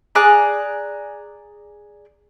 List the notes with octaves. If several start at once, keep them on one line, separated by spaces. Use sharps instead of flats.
G#4 D5 A#5 F#6